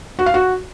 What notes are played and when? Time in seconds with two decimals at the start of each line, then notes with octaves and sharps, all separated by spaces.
0.19 F#4
0.26 F5
0.34 F#4